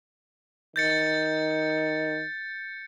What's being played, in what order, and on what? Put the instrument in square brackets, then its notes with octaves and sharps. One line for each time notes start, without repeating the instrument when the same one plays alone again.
[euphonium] D#3 [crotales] G6 A6 C#7